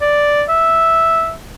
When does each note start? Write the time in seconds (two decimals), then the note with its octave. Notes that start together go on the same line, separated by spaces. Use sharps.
0.01 D5
0.49 E5